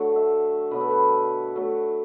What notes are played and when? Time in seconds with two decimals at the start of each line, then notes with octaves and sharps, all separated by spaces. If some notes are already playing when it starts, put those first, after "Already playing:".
Already playing: D3 F#3 A3
0.16 E5
0.71 B2 F#3 B3 B4
0.81 A4
0.91 B4
1.56 F#3 A3